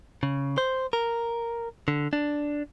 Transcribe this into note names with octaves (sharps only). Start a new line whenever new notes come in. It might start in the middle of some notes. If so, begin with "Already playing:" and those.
C#3
C5
A#4
D3
D4